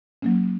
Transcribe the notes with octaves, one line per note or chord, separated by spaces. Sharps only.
F#3 A#3 C#4